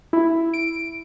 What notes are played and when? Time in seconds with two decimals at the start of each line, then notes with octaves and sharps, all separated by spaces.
0.13 E4
0.54 D7